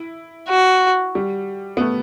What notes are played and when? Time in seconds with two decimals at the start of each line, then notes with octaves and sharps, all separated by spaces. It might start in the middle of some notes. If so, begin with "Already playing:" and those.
Already playing: E4
0.49 F#4
1.15 G3
1.77 B3
1.81 A3